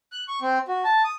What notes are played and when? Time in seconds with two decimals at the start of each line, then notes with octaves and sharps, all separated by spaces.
0.12 F#6
0.28 C#6
0.42 C4
0.68 F#4
0.84 A5
1.04 D#6